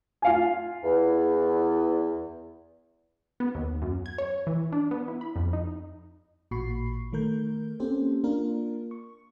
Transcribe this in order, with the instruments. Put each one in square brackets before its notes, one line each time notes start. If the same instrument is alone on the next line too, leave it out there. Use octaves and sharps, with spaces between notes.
[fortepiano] F4 F5 G#5
[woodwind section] E2
[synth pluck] B3
D#2
F#2
G#6
C#5
E3
D4
B3
E4
B5
F2
D#4
[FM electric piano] A1 A#2 F#4 B5 C#6 C7
D#3 A3 A#4 G6
A#3 C4 C#4 G4 A4 C5
A#3 D4 F4 A#4
C#6